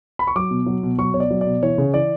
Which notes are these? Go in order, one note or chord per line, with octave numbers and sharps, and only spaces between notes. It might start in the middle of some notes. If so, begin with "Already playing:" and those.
B5
C#6
F#3 D6
B2
F#3
B2
F#3 C#6
B2 C#5
D5
F#3
D5
B2
E3 C#5
C#3
E3 D5